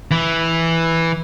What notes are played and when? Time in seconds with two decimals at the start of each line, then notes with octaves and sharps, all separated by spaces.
0.11 E3